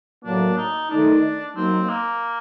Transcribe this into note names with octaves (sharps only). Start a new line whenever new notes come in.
A2 F#3 A#3 D4
D#4
D#3 A3 D4 D#4
F#3 A#3 C4 D#4
A#3